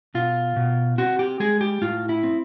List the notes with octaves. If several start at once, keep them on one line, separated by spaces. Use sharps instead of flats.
B2 F4
B2
C4 F#4
G4
G#3 G#4
G4
A2 F4
E4
C4